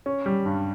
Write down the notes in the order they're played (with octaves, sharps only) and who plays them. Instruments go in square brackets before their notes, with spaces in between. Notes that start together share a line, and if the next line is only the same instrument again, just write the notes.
[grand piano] C#4
G3
G2